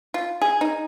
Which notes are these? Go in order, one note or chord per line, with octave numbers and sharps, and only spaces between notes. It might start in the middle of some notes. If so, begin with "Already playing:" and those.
F4
G#4
D#4